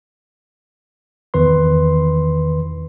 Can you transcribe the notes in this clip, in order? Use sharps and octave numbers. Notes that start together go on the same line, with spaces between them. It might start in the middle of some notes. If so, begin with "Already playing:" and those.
E2 D#3 B4 C6